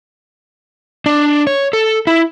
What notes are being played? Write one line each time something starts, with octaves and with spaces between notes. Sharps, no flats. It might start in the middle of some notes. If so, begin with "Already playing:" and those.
D4
C#5
A4
E4